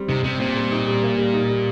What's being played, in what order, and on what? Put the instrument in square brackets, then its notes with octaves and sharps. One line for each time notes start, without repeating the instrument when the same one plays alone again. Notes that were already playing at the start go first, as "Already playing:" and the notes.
Already playing: [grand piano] G3 C4
[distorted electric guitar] C3 [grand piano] D#4
[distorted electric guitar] C3 [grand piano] G3
[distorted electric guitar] A#2 [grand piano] C4
[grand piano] G3
D#4
G3
A#3
G3
D#4
G3